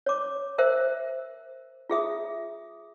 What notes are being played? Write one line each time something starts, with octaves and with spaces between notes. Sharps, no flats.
C#5 D6
A#4 C5 E5
F4 G#4 E5 D#6